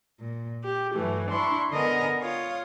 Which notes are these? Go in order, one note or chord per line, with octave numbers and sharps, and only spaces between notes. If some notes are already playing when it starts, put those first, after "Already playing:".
A#2
G4
G2 E3 F#3 A3
D4 E4 C6 C#6
D3 B3 A#4 D#5 G#5 A#5
F4 C#5 F5 D#6